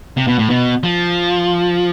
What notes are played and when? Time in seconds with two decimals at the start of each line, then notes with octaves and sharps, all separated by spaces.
0.17 C3
0.27 B2
0.39 A2
0.50 B2
0.83 F3